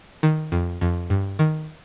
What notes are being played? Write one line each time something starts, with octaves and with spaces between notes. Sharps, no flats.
D#3
F2
F2
G2
D#3